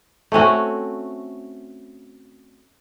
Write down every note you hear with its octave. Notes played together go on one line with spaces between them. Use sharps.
A3 C4 C#4 F#4